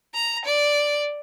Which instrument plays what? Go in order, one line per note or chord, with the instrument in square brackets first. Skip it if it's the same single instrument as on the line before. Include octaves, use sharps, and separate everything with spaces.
[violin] A#5
D5